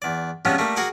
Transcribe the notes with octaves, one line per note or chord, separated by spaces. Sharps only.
E2 D5
C3 F3 G3 G#3 B3 C#4
G3 A3 A#3
F#4 G#4 A#4 F#5 G5 D6